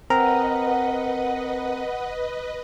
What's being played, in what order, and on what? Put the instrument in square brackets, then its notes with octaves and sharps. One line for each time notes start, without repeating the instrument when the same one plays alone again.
[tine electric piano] C4 A#4 A#5 [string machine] B4 D#5 [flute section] F#5